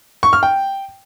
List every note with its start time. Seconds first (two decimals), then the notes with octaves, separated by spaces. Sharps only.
0.23 C#6
0.33 F6
0.43 G5